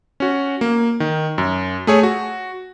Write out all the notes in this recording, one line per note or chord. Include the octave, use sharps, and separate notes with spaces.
C#4 F#4
A#3
D#3
F#2
A3 G#4 C#5
F#4